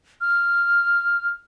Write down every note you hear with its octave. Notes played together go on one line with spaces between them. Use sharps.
F6